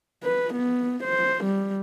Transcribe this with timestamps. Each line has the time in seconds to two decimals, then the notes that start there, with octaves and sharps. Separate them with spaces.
0.24 B4
0.54 B3
1.04 C5
1.45 G3